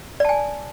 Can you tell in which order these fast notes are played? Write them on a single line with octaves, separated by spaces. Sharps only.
D5 A5 G#5